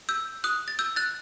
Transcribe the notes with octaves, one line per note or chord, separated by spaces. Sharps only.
E6 G6
D#6 F#6
A6
E6 G6
F#6 A6